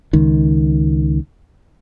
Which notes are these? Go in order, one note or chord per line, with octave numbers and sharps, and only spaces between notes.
C#2 D#3